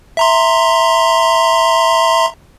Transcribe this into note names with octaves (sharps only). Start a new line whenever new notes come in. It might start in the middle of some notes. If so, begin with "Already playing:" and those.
E5 A#5 C6